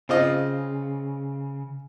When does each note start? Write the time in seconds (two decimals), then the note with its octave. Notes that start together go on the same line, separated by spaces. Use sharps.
0.09 C#3 C4 F4 D#5